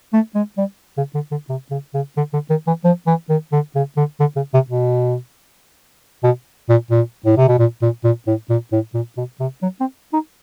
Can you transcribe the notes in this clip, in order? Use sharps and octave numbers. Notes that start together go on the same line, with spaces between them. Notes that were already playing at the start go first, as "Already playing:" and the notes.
A3
G#3
G3
C#3
D3
D3
C3
C#3
C#3
D3
D3
D#3
E3
F3
E3
D#3
D3
C#3
D3
D3
C#3
C3
B2
B2
A#2
A#2
A2
C3
B2
A#2
A#2
A#2
A2
A#2
A2
A#2
B2
C3
F#3
C4
D#4